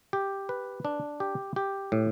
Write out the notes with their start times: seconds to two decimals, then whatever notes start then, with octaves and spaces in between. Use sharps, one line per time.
0.13 G4
0.49 B4
0.85 D4
1.20 G4
1.56 G4
1.92 A2